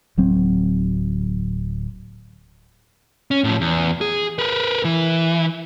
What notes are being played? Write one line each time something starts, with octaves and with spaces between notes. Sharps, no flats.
D1 F#3 C4
C#4
A2 F3
E2
G#4
A#4 B4
E3